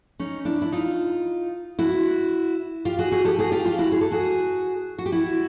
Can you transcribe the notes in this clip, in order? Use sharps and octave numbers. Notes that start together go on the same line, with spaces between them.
C#4 D#4
D4 E4
E4
D#4 F4
E4 F#4
F4 G4
F#4 G#4
F#4 G#4
G4 A4
F#4 G#4
F4 G4
F4 G4
E4 F#4
G#4
A4
F#4 G#4
F#4
G4
E4 F#4